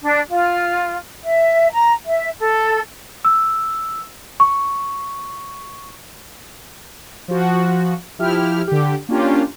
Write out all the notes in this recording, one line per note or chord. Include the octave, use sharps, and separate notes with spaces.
D4
F4
E5
A#5
E5
A4
E6
C#6
F3 F#4
F3 E4 G4 F6
D3 G4
A#3 C#4 D4 F4 G4